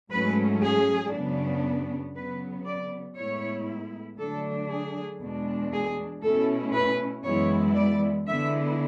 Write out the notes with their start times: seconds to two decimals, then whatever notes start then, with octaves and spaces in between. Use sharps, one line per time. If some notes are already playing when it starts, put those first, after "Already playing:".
0.12 G#2 F#3 A3 C#4 B4
0.63 G#4
1.14 F#2 C#3 F#3 B3 D4
2.15 C#3 F#3 B3 B4
2.66 D5
3.17 A2 G#3 B3 E4 C#5
4.19 D3 F#3 A3 D4 A4
4.70 G#4
5.21 E2 B2 G#3 D4
5.73 G#4
6.23 B2 A3 C#4 E4 A4
6.75 B4
7.25 F#2 E3 G#3 B3 E4 C#5
7.76 D5
8.27 D3 G#3 B3 E4 E5